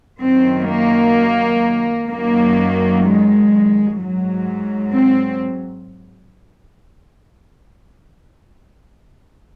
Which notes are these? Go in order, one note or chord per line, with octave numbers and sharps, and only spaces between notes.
F#2 D#3 F#3 C4
A#3
F#2 D#3 F#3 A#3
G#3
G#2 F#3
C4